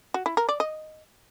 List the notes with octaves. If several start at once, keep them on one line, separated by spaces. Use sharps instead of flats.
F#4
E4
A#4
D5
D#5